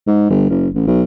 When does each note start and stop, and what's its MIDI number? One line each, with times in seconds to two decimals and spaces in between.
0.07 0.30 44
0.31 0.49 31
0.50 0.68 30
0.75 0.86 33
0.87 1.03 35